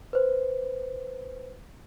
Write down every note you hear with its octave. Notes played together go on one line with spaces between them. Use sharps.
B4 C5